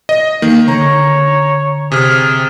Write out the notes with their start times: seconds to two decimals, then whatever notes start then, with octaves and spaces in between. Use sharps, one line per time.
0.09 D#5
0.42 D#3 A#3
0.68 D3 C#5 A#5
1.92 C3 G#4 F6